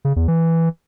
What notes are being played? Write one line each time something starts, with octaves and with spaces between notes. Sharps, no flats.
C#3
E2
E3